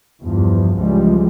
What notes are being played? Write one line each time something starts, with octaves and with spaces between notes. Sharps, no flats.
E2 G2 F3
C#2 E3 F3 G3 G#3